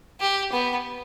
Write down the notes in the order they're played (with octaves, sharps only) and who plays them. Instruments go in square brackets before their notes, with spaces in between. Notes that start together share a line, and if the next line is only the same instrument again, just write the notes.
[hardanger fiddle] G4
B3